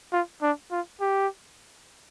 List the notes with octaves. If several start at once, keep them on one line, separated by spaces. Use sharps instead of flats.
F4
D4
F4
G4